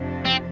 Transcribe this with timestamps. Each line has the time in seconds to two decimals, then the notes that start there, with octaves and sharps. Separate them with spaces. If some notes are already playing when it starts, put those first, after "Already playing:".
Already playing: F2 C3 F3 D4
0.25 C4